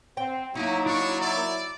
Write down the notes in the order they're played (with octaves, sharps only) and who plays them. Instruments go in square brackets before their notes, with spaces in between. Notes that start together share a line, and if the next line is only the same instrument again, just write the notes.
[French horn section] C4 [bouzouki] G5
[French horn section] F#3 [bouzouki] A#3 D#4 [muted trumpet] E4
[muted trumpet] D4 [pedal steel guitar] E4 C#6
[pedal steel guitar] E4 [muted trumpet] D5